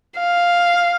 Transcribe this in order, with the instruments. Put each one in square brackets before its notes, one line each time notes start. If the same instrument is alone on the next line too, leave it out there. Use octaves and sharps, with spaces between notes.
[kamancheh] F5